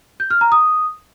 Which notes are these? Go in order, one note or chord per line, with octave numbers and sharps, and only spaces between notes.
G6
F6
A#5
D#6